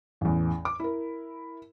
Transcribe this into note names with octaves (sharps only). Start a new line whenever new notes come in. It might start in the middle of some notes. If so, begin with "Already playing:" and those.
A1 E2
D6
E4 A#4